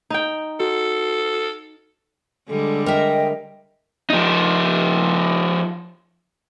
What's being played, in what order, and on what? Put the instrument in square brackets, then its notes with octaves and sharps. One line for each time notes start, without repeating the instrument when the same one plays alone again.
[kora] D#4 G5
[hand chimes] F#4 [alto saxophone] A4
[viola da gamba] D3 G3 G#3 [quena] A4
[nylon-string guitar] A#4 E5 [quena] D#5 [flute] G5
[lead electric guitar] F3 D#4